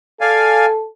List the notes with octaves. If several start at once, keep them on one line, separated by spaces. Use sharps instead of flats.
A4 D5 F5 G#5